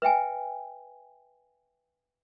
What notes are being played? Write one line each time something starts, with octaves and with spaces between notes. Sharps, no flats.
B4 E5 G5 G#5